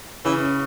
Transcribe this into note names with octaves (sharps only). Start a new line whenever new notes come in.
C#3 E3